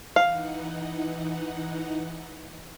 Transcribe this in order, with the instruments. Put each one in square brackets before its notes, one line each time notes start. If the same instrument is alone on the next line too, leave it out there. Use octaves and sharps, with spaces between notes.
[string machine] E3 D#4 F#5 [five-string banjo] F5